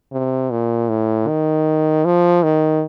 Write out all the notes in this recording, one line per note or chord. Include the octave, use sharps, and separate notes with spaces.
C3
A#2
A2
D#3
F3
D#3